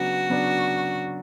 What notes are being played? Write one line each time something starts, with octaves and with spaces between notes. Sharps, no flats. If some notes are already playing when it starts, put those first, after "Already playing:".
Already playing: C#3 F#3 B3 D4 F#4
C#3 F#3 B3 D4